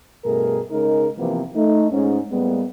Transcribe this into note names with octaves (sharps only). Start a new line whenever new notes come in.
G2 B2 A3 G#4 A#4
C#3 G#3 D#4 A#4
C3 E3 F3 A#3 B3
A3 D#4
G#2 C#4
A2 G3 G#3 A#3 B3